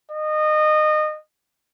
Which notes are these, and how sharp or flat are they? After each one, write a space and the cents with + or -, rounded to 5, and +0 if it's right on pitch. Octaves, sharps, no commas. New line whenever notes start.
D#5 -25